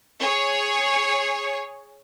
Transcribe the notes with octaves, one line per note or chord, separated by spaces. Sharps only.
G#4 C#5